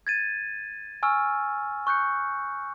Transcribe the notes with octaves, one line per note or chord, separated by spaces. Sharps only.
G#6 A6 D#7
G#5 C#6 E6 F6
C#6 F#6 G6 C#7